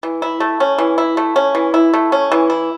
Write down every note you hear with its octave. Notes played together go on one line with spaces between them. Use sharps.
E3
E4
A3
C#4
E3
E4
A3
C#4
E3
E4
A3
C#4
E3
E4